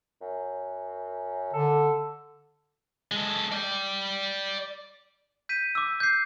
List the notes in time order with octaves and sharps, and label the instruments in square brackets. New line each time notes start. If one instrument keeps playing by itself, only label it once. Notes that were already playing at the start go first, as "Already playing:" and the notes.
[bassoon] F#2
[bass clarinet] D3 [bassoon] A4
[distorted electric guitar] G#3 A4
D5 G5
[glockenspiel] G6 B6 D#7
D6 E6
G6 C7